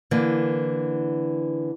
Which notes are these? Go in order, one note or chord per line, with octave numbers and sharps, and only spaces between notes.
D3 E3 A#3